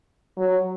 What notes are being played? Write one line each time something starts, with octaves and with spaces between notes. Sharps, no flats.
F#3